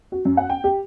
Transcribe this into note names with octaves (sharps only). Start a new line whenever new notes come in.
F#4
F#2
F#5
G5
G4